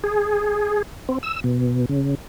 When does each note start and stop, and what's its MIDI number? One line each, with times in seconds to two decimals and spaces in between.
0.04 0.82 68
1.09 1.18 60
1.23 1.40 88
1.44 1.86 47
1.89 2.15 49